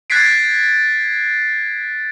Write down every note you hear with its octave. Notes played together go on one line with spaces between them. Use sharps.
F#6 G#6 A6 B6 C7 D7